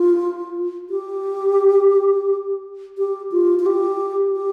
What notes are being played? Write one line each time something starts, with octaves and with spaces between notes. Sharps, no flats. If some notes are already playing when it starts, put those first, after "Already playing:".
Already playing: F4
G4
G4
F4
F4
G4
G4